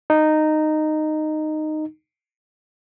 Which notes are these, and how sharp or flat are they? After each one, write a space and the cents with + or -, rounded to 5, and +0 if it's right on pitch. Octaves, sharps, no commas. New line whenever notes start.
D#4 -10